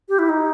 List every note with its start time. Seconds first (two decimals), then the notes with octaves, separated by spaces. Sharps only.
0.09 G4
0.19 E4
0.29 D#4